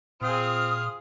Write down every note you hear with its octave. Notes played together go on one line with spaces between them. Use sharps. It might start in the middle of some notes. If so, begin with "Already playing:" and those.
A#2 C4 F4 G#4 D#6 F6